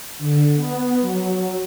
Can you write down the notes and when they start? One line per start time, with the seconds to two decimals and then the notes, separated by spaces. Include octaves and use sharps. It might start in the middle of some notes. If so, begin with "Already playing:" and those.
0.18 D3
0.55 B3
1.01 F#3